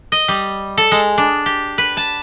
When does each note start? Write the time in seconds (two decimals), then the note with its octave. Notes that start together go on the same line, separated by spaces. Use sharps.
0.12 D#5
0.28 G3
0.78 A4
0.92 G#3
1.18 D4
1.46 G4
1.78 B4
1.97 A5